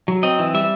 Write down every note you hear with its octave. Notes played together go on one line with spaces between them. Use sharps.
F#3
C4 D#5
E3
G3 E5